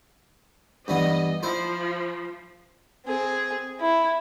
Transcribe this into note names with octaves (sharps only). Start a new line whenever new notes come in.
G2 E3 B3 D#5
F3 E4 C5
C4 G#4
E4